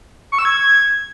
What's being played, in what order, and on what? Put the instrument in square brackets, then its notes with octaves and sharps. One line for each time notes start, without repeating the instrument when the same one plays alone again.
[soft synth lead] C#6
E6
G#6